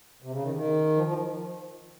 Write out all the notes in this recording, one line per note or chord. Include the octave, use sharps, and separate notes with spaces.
C3
C#3
D#3
D#3
F3
F3